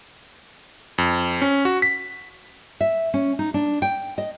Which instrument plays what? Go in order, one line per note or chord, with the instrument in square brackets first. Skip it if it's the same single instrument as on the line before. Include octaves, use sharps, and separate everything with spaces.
[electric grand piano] F2
C#4
F#4
B6
[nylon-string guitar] E5
C#4
D#4
D4
G5
D#5